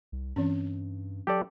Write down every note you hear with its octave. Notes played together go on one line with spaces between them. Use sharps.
C2
G2 E3 C4 C#4
F#3 G4 A4 D5